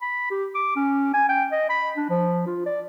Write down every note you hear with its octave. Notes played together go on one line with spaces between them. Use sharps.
B5
G4
D6
C#4
G#5
G5
D#5
B5
D4
F3
F4
D5